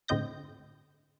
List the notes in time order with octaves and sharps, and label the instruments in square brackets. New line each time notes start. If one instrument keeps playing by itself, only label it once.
[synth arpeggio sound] A2 D3 C4 D#5 G6 A#6